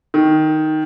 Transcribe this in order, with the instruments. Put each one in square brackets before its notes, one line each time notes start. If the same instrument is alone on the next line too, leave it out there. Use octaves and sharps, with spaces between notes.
[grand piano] D#3